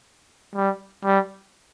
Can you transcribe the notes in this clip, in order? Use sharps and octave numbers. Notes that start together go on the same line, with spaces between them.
G3
G3